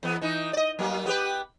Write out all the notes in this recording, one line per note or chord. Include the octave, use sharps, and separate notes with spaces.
E2 B3
E3 D#4
D5 D#5
F#3 A#3 B3
B3 G4 B4